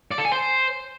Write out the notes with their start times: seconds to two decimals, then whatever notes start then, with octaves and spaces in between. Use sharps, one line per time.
0.11 D5
0.18 A4
0.25 G#5
0.32 C5